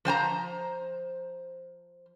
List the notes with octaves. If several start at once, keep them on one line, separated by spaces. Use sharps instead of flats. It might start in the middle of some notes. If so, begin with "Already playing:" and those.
F3 C5 G#5 A#5